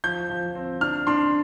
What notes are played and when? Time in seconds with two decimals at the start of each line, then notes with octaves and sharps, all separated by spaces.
0.04 F3 G6
0.30 F3
0.55 C4
0.81 D4 F6
1.07 D4 C6